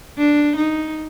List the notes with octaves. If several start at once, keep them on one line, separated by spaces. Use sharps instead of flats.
D4
D#4